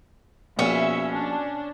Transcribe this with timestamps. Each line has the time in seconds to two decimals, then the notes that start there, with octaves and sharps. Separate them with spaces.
0.59 A#1 B2 C#4 E5
1.14 D4